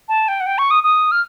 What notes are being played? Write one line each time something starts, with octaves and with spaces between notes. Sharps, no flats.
A5
G5
F#5
G5
C#6
D#6
D#6
F6